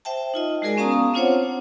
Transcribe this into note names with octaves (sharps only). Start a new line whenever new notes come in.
C5 E5 G5 A5
D#4 F4 D#5
G#3 F#4 G#4 A#4 D5 G#5
B3 C#4 F5 A5 A#5 D#6
C4 D4 F4 C5 C#5 F#5